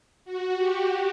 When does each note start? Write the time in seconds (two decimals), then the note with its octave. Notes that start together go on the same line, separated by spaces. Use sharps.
0.25 F#4
0.58 G4